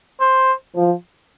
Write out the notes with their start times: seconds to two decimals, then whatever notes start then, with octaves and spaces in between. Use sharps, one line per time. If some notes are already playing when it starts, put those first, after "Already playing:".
0.20 C5
0.74 F3